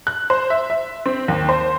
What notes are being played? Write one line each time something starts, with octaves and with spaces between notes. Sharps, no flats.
F#6
C5
E5
E5
C4
D#2
C5